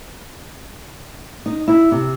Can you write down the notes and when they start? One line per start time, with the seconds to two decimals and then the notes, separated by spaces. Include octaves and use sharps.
1.46 D#4
1.68 E4
1.91 C3